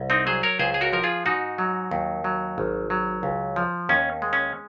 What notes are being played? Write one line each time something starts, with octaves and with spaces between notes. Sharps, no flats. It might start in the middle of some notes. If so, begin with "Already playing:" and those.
Already playing: C2
C4 D#4
F#3 G#4 C5
A#4 C#5
C#2 G#4 C5
G#4
F#4 A#4
F3 A#4
F4 G#4
G#2 D#4 F#4
F#3
D#2
F#3
G#1
F#3
C#2
F3
D#2 C#4
G#3
C#4